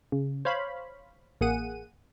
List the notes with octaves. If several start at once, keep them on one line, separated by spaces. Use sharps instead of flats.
C#3
C5 C#5 F5 B5
A1 A#3 G#4 F#5 D#7